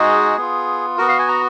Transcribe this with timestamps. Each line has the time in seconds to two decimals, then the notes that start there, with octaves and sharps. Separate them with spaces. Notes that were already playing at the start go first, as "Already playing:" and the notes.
Already playing: G#3 D#4 F#4 G#4
0.37 B3 F4
0.98 B3 F#4 A#4
1.09 F5
1.19 G#5
1.28 A#5